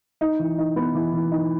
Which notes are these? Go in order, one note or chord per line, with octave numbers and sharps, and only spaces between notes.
D#4
E3
D#4
B3
E3
E3
D#4